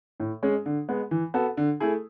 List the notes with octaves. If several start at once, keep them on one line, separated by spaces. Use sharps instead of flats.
A2
G#3 C#4 G#4
D3
G#3 B3
E3
B3 F#4 A4
D3
A3 E4 G#4